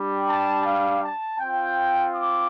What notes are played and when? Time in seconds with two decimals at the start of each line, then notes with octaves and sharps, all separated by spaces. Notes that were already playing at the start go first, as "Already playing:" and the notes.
Already playing: G3 D4 G4
0.28 A5
0.64 F5
1.02 A5
1.39 C4 F4 G5
2.14 D6